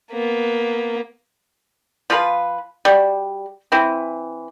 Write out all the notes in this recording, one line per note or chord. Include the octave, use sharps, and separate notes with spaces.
A#3 B3
F3 F4 A4 B4
G3 F#4
E3 C4 E4